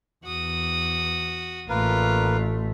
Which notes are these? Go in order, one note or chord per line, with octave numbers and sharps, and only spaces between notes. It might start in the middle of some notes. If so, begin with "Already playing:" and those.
E2 F#4 D#6
A1 A3 A#3 F4 A#4 B4